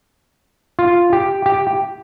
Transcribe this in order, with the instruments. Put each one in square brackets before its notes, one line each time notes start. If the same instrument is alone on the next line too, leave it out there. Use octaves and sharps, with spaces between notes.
[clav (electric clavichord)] F4
G4
G4